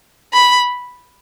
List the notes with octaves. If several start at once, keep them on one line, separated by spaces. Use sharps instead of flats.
B5